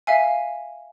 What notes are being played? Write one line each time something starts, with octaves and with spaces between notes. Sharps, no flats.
E5 F5 G#5